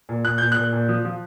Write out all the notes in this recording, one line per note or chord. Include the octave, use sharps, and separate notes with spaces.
A#2
A#2 F#6
A#2 G6
A#2 F#6
A#2
F3
F3